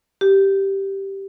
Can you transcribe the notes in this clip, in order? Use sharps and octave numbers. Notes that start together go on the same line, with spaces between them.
G4